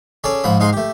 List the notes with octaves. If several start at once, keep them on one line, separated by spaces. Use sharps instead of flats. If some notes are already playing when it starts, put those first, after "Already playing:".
C#4 G#4 A4 D5
G#2 F3 B5 D#6
G#2 G#3 D#4 G#4 F5 C6
A3 G4